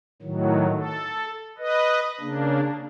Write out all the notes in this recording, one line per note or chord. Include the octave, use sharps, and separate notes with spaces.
A2 D#3 F#3
A4
B4 D#5
C#3 A#3 D4